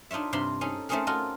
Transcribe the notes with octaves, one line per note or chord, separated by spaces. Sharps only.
D4 D#4 F4 C#5 E5
G2 C3 F5 B5 C6
C#4 D#4 G#4 A4
A3 C4 C#4 D#4 G#4 A#4
F4 F#4 A4 A#4 D#5